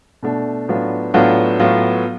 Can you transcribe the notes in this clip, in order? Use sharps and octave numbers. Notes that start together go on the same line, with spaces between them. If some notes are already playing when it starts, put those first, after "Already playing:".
B2 A3 D4
A2 F#3 B3 D4 F4
A2 F#3 B3 D4 F4
A2 F#3 B3 F4